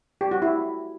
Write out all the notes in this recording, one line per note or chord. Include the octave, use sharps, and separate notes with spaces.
G4
F#4
E4